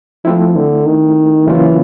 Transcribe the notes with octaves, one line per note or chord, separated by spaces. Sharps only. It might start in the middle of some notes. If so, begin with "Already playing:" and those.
F3 A3 C4 E4
D3
D#3
C#3 E3 F#3 A#3 C#4 F4